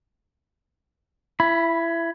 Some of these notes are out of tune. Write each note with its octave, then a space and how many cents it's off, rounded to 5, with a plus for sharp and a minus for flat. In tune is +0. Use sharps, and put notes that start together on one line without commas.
E4 +25 B5 +0